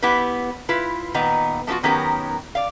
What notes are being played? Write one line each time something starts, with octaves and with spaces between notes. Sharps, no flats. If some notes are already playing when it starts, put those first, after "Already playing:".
B3 E4 G4 B4
E4 F4 B4
A#2 D#3 B3 D#5 A#5
F3 A3 B3 F4 F#4
D#3 F#3 B3 C#4 G4 A#4
D5 F5